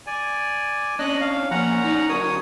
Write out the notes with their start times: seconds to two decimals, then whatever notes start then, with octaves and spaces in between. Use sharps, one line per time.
0.07 D5 G#5
0.99 C#4 D4 D#5 F#6
1.21 F5
1.51 F3 A#3 C#4 F#5 A#5
1.84 D#4 D5
2.09 D3 F#3 A#4 C#5 D#6